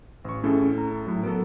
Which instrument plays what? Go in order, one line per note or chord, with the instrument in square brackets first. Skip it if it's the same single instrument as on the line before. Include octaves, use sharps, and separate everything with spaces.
[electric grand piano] A1 C#6
[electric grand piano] A2 A4 [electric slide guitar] C#4 G#4
[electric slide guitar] A#5
[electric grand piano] A2 F#3
[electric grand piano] F#3 B3 A4 [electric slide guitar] A#4